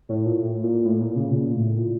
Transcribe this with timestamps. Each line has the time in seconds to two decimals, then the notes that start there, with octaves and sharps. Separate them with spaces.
0.09 A2
0.25 A#2
0.40 A2
0.63 A#2
0.85 A2
1.00 A#2
1.16 C#3
1.31 A#2
1.54 A2
1.77 A#2